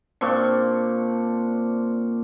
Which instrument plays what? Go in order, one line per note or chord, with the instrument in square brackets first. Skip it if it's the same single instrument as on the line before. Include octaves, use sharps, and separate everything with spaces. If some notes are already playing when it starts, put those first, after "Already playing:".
[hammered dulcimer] A#2 C4 D4 C#6